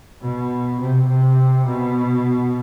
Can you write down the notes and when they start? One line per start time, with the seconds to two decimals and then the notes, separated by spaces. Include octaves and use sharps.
0.21 B2
0.80 C3
1.08 C3
1.66 B2